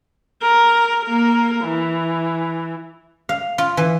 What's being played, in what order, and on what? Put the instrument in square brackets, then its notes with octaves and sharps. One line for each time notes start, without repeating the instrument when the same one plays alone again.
[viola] A#4
A#3 A#4
E3
[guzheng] F5
F4
E3